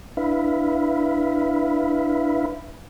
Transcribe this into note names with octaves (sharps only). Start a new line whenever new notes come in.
D4 E4 B4 E5 F5 B5